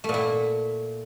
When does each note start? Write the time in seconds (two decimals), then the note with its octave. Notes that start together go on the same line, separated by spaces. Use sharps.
0.04 A3
0.09 A#2
0.14 E4